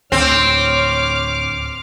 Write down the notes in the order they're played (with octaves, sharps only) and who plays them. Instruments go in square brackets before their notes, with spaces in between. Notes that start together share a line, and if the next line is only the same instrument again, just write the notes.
[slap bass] D2 A2 [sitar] C4 [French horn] C#5 [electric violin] D6 F6